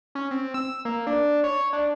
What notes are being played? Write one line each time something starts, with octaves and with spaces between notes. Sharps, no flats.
C#4
C4
E6
A#3
D4
C#5
D4